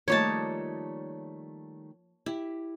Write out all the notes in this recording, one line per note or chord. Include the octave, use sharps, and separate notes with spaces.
D#3 F3 G3 A3 A#3 D#4 C#5 A5
E4 G4